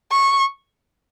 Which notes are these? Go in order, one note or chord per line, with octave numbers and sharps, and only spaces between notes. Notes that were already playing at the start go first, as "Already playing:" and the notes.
C#6